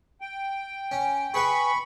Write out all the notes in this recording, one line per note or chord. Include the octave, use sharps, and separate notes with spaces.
G5
C#4
G#4 B4 G5 B5 C#6